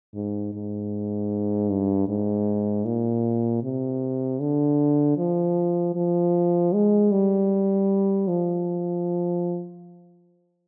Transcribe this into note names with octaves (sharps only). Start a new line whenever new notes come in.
G#2
G#2
G2
G#2
A#2
C3
D3
F3
F3
G#3
G3
F3